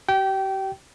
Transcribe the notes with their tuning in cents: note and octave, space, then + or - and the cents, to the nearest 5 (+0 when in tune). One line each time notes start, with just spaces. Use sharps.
G4 -40 G5 -20